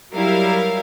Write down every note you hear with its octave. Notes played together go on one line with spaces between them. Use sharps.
F#3 G3 E4 A#4 F5